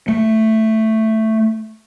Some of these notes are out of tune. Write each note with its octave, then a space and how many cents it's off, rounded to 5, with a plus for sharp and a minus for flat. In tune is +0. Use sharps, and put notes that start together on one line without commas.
A3 +5